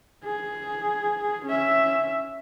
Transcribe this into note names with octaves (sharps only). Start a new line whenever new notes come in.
G#4
C#4 E5